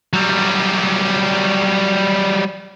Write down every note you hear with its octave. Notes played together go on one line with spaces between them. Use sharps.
F#3 G3